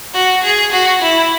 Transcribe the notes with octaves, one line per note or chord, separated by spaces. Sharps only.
F#4
G#4
F#4
E4